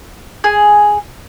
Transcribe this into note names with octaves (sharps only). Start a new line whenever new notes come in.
G#4